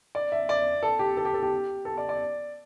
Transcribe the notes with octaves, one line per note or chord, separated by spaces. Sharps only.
D5
E5
D5
A4
G4
A4
G4
A4
G4
A4
D5
D5